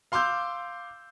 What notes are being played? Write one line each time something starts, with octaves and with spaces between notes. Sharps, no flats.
F5 C6 D6 E6 G6